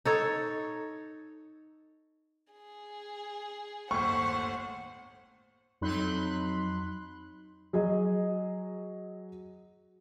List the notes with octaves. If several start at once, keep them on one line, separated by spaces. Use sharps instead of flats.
D#4 A4 C#5
G#4
G1 D#2 A2 C5 F#5 C#6
F2 F#3 D#4 B5 C6 F#6
F#3 G#4 D#5